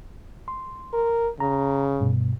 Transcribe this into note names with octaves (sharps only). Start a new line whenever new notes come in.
C6
A#4
C#3 A#5
G2 B2